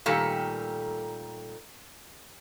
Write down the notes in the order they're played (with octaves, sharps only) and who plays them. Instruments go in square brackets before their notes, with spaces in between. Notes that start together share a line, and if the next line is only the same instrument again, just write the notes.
[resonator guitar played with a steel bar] A#2 D#3 G3 A3 A4